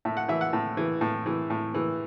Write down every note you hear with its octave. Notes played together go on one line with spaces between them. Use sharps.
A2 E5
F#5
E3 E5
F#5
A2
E3
A2
E3
A2
E3